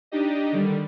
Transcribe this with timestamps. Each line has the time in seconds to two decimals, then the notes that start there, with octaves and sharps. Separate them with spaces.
0.12 D4 D#4 G4 D#5
0.52 D3 D#3 G3